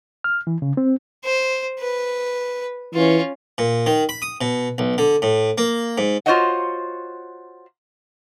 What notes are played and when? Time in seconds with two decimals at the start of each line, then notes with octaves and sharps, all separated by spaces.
0.24 F6
0.47 E3
0.62 C#3
0.77 C4
1.24 C5
1.80 B4
2.94 E3 C#4 F4
3.58 A#2
3.86 D#3
4.09 B5
4.22 D#6
4.41 B2
4.78 B1
4.98 D3
5.22 A2
5.58 A#3
5.98 G#2
6.26 F4 F#4 C5 C#5 D#5 F#5